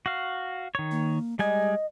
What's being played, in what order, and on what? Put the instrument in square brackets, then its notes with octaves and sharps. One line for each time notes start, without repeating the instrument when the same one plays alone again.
[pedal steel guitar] F#4 F5
D#3 C#5
[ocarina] A#3
[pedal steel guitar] G3 G#3 G#5 [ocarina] D#5